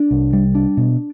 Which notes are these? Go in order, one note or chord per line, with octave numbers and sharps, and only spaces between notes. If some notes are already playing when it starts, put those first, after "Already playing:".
Already playing: D4
C2
G3
D4
B2